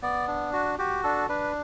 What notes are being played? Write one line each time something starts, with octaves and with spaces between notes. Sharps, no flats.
B3 D5
D4
F#4
F#4 G4
D4 A4
D4 B4